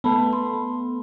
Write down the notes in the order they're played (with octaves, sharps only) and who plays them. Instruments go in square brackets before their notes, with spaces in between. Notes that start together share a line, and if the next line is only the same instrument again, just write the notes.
[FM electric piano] A3 B3 [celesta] B4 A5 B5
[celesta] C6